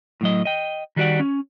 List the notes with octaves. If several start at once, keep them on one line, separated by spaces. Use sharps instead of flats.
A2 F#3 D#5
D#5 G5
D#3 G3 F#4 B4 D5 F#5
C#4